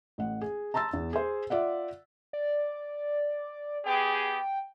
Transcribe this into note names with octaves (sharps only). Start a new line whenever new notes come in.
A1 F#5
G#4
A5 A#5 C6 E6 A6
E2
G#4 C5
F4 D5 E5 F#5
D5
B3 G4 G#4 G5